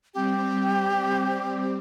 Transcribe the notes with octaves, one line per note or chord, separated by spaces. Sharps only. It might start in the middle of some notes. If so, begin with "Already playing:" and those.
G3 C4 G4